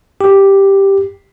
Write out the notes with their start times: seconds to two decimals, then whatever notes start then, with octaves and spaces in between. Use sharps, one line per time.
0.21 G4